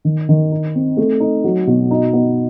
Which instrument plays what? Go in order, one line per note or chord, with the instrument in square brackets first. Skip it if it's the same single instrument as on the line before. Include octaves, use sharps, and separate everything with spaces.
[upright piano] D#3
D#3
D#4
C4
A3
D#4
F#3
B2
D#4
B3